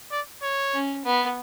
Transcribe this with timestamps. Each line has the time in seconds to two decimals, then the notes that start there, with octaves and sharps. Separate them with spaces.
0.12 D5
0.43 C#5
0.73 C#4
1.04 B3